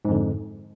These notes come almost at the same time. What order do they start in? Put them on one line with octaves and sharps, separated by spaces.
G#2 F2 D3